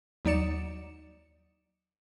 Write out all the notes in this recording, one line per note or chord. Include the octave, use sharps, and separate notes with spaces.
D#2 F#3 D#4 D5 C#7 E7